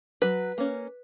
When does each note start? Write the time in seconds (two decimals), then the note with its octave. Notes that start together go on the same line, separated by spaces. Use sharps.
0.22 F#3 B4
0.58 A#3 C#4